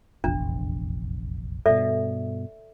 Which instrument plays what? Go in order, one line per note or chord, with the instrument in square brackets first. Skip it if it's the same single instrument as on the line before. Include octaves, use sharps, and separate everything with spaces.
[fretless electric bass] F1 A#1 E2 [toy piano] D4
[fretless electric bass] G2 B2 [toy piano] A4 D5 E5